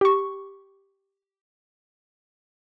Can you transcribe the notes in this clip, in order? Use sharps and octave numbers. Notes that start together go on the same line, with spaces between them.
G4 C#6